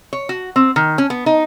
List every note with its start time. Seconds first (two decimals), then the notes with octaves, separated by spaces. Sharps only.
0.13 C#5
0.29 F#4
0.56 C4
0.76 D#3
0.98 C#4
1.10 B3
1.26 D#4